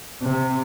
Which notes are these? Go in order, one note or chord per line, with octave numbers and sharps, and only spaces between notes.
C3